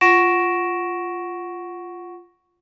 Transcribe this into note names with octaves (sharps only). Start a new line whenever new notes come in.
F4 F#5 C#6 A#6 D7 E7